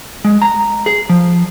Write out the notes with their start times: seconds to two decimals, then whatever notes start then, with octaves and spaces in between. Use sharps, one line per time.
0.25 G#3
0.42 A#5
0.86 G#4
1.09 F3